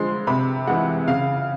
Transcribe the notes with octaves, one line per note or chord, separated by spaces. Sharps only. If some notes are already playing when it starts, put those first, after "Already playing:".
Already playing: D3 F3 G#3 C6
C3 B5
E3 G#3 F#5
C#3 F5